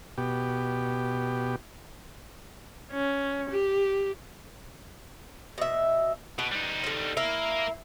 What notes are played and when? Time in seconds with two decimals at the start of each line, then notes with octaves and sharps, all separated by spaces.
0.18 B2 G4
2.92 C#4
3.50 G4
5.58 B2 E5
6.39 B2 B4
6.52 G3 D#4
6.84 D3 C4
7.17 E4 A#4 F5